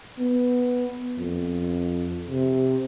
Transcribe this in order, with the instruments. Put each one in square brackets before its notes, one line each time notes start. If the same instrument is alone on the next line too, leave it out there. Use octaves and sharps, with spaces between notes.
[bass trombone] B3
F2
C3